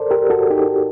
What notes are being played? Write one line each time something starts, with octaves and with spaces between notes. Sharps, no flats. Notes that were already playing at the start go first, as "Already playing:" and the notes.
Already playing: A4 A#4 C5 D5
G4 A#4
F#4 A4
D#4 G4